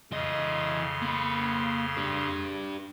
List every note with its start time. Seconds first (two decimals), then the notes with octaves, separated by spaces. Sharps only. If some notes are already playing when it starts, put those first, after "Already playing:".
0.12 F2 C#3 E3 D#5 C6
1.02 A#3 B5
1.97 D4 G4